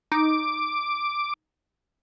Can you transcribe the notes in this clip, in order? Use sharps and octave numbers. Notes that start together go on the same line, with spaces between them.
D#4 D6